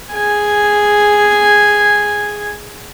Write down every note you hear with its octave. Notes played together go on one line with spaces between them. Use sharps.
G#4 G#5